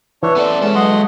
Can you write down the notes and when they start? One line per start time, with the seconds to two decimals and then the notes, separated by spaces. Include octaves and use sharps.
0.23 E3 D4 C#5
0.37 B3 A4 C5 D5
0.62 G#3 C#4 A4 A5
0.75 F#3 D#5 F#5 C6